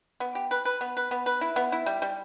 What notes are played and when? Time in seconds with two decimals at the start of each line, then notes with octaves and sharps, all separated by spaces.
0.20 B3
0.35 G4
0.51 B4
0.65 B4
0.81 B3
0.97 B4
1.11 B3
1.26 B4
1.41 E4
1.56 B3
1.72 E4
1.86 G3
2.02 G3